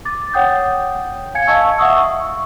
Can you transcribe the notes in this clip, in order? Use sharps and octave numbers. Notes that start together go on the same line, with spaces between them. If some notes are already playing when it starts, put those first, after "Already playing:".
D6 A6
C#5 F#5 G5 D#6 G6
F5 G#5 G#6 C#7
D#5 F5 A5 C#6 E6
E5 F#5 C#6 D#6 E6
C#6